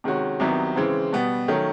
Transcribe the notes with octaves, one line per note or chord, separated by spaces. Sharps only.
C3 D#3 G#3 C#4 F#4
C2 C3 D#3 F#3 B3
C#3 E3 G#3 C4
B2 G3 B3
D#3 F#3 A3 C#4